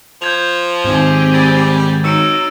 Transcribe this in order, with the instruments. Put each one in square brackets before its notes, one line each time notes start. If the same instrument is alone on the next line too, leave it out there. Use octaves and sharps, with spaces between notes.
[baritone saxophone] F3 [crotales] G6 G#6 F7
[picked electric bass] G#2 D#3 [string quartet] C4 G4 G#4
[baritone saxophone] G3 [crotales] A6
[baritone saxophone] F#3 [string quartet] D#4 [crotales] E6 C#7 D7